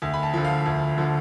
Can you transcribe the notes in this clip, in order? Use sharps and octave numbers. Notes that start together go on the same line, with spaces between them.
D2
B5
A5
D3 F3
F5
D2
D3 F3